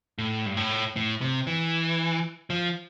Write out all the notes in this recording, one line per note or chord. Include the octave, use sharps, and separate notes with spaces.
A2
G2
A2
A2
C3
E3
F3